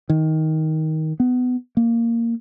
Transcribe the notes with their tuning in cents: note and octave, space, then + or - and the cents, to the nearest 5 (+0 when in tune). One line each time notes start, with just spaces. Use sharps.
D#3 +15
B3 +20
A#3 -10